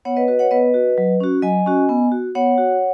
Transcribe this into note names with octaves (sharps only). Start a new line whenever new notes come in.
B3 C#5 F#5
B4 D#5
F#4 B4 D#5
C#5 F#5
B3 B4 D#5
F#4
F#3
C#4 F#4
F#3 D#5 G#5
C#4 F#4
B3
F#4
B3 C#5 F#5
F#4